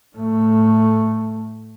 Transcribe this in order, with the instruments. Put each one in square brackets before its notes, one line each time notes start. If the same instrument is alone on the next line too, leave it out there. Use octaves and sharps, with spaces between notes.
[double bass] A2 A3